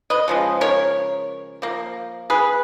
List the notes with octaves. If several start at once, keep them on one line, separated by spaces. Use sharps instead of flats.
B4 D#5
C#3 F3 G#3
A#4 C#5
F3 A#3
G#4 B4